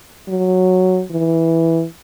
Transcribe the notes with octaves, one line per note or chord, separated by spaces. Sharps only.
F#3
E3